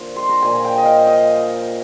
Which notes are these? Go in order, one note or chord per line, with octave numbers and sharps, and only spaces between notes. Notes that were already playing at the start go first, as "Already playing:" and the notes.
Already playing: D3 F3 A#3
C6
A#5
A#2 F3 A#3 G#5
G5
D#5
F5
D#5